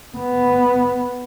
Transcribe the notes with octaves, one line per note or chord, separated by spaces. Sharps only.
B3